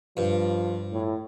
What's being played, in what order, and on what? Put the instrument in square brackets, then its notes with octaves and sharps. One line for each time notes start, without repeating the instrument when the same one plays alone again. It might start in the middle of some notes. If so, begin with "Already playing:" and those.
[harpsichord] G2 [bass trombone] F3
[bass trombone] A2